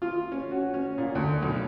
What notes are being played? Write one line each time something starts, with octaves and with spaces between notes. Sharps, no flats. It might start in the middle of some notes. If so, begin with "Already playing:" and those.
F4
C#4
F#4
C#4
A#2
D2
B1